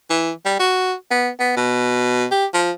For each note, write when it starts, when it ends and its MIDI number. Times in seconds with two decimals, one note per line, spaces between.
0.10 0.31 52
0.45 0.58 55
0.60 0.94 66
1.11 1.29 59
1.40 1.57 59
1.57 2.26 47
2.31 2.46 67
2.54 2.72 53